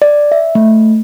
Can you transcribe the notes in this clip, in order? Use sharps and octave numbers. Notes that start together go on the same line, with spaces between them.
D5
E5
A3